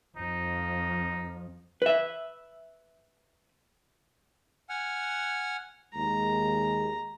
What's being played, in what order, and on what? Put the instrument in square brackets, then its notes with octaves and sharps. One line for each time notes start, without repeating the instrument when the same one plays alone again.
[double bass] F2 F3 [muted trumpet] D#4
[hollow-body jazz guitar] B4 E5
[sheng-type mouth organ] F#5 G#5 F6
[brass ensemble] D#2 G#3 [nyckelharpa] A#5